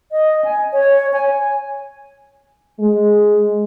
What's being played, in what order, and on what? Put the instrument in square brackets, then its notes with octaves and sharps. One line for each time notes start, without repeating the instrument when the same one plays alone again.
[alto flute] D#5
G#5
C#5
G#5
[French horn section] G#3